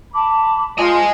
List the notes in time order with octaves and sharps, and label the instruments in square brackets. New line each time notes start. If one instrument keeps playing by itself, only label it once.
[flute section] A5 B5 D6
[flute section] F4 C5 [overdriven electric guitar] D#5 G#5